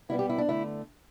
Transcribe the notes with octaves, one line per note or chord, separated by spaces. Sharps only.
B2 G3 B3 E4
G4
E4
D4
D3 A3 E4